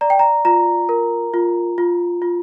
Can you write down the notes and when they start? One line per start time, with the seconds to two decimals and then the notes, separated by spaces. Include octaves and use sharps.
0.01 D5 A#5
0.10 G5
0.19 A#5
0.45 F4 A#5
0.89 A#4
1.34 F4
1.78 F4
2.22 F4